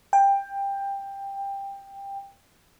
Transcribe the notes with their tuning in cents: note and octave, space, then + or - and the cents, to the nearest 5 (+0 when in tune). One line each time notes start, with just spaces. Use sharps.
G5 +15